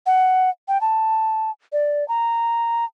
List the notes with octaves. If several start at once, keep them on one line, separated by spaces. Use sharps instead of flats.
F#5
G5
A5
D5
A#5